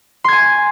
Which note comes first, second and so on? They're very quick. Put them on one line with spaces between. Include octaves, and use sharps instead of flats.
C6 G#6 G#5